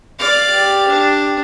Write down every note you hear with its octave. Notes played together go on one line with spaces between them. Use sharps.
D5 F5
G4
D4